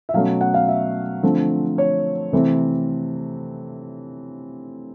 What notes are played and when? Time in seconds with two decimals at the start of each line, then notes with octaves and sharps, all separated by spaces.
0.09 E5
0.14 B2 F#3 A3 C#4 F5
0.41 F#5
0.54 F5
0.68 E5
1.23 D3 F3 A3 C4
1.78 C#5
2.32 C3 E3 A3 C4